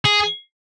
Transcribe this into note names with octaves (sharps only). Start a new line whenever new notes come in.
G#4